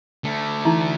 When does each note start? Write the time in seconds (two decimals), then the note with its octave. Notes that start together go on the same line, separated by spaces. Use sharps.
0.24 D3 A3
0.65 E3 D#4 E4